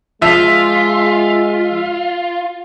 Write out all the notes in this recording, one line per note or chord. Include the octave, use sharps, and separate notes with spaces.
F3 G#3 F4 E5